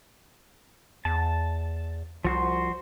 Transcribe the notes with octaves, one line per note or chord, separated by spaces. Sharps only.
E2 A5
C2 F3 F#4 C5